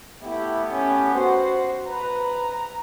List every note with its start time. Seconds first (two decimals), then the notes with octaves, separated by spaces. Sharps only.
0.23 A3 B3 E4 G4
0.70 C#4
1.15 F#4 C5
1.88 B4 A#5